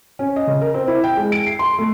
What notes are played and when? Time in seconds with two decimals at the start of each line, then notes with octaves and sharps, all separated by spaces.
0.19 C#4
0.36 D#5
0.47 C#3
0.61 A#4
0.74 C4
0.88 E4
1.04 G5
1.17 G#3
1.32 D7
1.47 C7
1.59 C6
1.79 A3